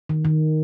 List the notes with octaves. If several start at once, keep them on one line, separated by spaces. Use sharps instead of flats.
D#3
D#3